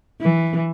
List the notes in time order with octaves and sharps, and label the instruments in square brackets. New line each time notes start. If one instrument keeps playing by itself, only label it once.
[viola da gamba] E3